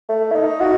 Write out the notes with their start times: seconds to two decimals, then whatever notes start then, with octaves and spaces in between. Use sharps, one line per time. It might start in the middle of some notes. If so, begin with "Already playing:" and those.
0.09 A3
0.32 E4
0.35 D#4
0.61 F#4